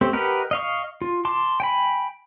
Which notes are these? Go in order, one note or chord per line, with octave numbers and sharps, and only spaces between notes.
A3 C4 G4
G4 A#4 B4 D#5 F#5
D#5 F5 C#6
F4
A5 C6 D6
G5 G#5 B5